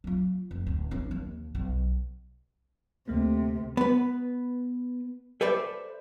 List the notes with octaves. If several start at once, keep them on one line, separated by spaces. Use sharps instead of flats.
F#3 F4
F1
D1
C#4 E4
D#2 E3
B1
D2 C3 A3 A#3
B3 B4
A4 B4 C5 D5 E5